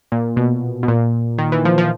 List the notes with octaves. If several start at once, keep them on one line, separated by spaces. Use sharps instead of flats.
A#2
B2
B2
A#2
D#3
E3
F3
F3